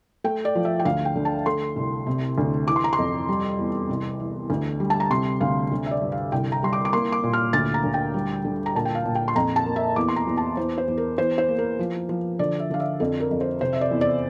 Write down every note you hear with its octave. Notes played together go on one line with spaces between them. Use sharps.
A3 G5
D5
F3
E5
G5
D2 F5
G5
D3
A5
A3 C6
C2
C3
D2
E3 D6
C6
A#5
C6
F2
G3
E2
C2
E3
D2
G3
A5
A#5
C3 C6
D2 F5
D3
E5
D5
G2
F5
C2 G5
A#5
G3 C6
D6
D6
A#3 C6
D6
A#2
F6
D2 A6
A#5
D2
G5
G3
D3
A#5
A#2 A5
G5
F5
A#2
G5
C6
F2 A#5
A5
A#3
E5
E2 D6
C6
A#5
E2
A5
E2 C5
C5
E2
A#4
E2 C5
C5
A#3
A#4
F3
F3
D3 D5
E5
D3 F5
E5
F2 A4
A#4
F2
C5
C3 C5
E5
D5
E2
D5